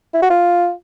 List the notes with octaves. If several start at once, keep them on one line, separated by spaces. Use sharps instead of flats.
E4
F#4
F4